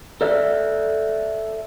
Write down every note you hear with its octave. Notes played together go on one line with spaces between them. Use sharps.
A4 D5 E5